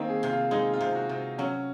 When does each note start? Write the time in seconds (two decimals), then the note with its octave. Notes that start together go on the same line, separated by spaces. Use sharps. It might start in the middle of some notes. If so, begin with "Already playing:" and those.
Already playing: D#3 A#3 C4
0.08 G#4
0.23 C3
0.30 F4
0.51 G#3 D#4
0.73 F4
0.81 C3
0.95 F#4
1.09 C3
1.38 F#3 C#4